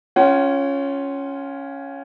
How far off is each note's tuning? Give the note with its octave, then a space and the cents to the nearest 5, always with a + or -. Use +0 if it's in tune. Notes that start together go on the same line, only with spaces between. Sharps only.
C#4 +0 F4 +0 F#5 +45